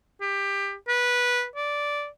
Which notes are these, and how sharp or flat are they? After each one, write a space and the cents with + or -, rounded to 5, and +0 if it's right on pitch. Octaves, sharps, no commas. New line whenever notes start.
G4 +20
B4 -15
D5 -10